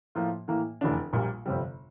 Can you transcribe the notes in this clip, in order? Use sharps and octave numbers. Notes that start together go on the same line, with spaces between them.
A2 F3 A#3 F4
A2 E3 A#3
F1 E2 D3 A3 D4
A#1 A#2 G3 A#3
G1 F2 C3 G3